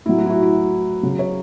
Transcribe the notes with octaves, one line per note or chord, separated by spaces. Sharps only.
A2 F#3 E4
F#4
E4
F#4
E4
C#3 F#3
C#5